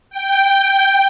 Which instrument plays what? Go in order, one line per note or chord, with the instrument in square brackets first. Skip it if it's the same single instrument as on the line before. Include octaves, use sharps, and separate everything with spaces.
[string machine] G5